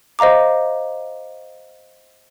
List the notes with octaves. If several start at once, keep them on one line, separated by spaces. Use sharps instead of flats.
C5 D#5 F5 A#5 D6